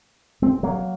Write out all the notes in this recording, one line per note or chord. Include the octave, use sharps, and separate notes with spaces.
G#3 C4
F#3 A#3